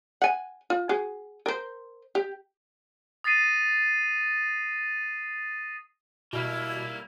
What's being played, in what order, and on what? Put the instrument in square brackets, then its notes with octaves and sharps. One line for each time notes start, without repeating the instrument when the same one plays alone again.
[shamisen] F#5 G#5
F4
F#4 G#4
A#4 C5
G4
[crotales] D#6 A6 A#6 C7 D#7
[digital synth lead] B2 [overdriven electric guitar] G3 A#3 [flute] E4